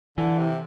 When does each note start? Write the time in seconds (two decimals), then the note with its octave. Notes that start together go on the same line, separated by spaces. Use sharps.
0.18 D3 E3
0.39 C3